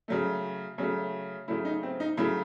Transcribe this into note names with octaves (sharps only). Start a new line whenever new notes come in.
C#3 F#3 A3
C#3 F#3 A3
C#3 F#3 A3 E4
D#4
C4
D#4
C#3 F#3 A3 E4